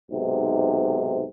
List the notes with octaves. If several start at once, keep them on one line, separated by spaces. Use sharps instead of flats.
B1 G#2 C3